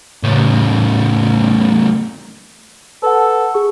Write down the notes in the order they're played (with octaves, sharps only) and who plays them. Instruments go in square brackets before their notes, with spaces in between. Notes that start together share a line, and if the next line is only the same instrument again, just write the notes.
[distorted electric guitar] A2 C#3
[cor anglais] A4 [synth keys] B4 F#5
[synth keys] G#4 C#6